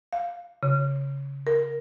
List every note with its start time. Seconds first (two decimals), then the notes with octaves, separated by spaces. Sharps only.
0.13 F5
0.63 C#3
1.47 A#4